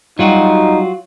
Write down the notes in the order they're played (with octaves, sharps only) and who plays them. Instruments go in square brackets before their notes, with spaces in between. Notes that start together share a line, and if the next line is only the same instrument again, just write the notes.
[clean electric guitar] F#3 F4 F#4 [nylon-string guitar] G3 [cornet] D#4